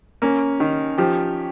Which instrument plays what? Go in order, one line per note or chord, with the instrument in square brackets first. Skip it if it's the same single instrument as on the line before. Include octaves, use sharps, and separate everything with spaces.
[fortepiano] A#3 [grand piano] C#4
[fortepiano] D#3
[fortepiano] F3 [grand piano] G4